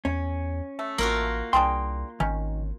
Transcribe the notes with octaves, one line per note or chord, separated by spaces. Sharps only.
E2 C#4
A3
A1 A#3 F4 F#4
C2 D4 G#4 G5 C6
G#1 D#3 C#4